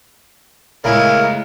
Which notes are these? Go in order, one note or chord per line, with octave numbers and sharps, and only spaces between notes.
C#3 G#3 A3 B3 E4 A#4